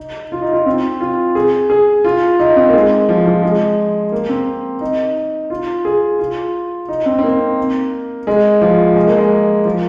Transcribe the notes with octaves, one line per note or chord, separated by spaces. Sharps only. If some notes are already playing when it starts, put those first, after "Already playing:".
Already playing: D#4
F4
D#4
F4
C4
F4
G#4
G#4
F4
D#4
C4
A#3
G#3
F3
F3
G#3
A#3
C4
D#4
F4
G#4
F4
D#4
C4
C4
A#3
G#3
F3
G#3
A#3
G#3
F3